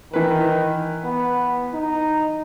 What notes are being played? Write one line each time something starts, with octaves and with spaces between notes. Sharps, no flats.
D#3 E3 B4
B3
D#4